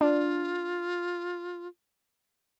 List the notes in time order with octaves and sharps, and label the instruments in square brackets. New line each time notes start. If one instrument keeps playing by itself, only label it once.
[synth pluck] D4 [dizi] F4